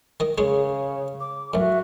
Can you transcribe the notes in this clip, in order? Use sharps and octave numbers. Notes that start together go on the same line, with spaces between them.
D#3 D#5
C#3 G#3 C#4 D#4 C#5
D6
A1 F#2 F#4 E5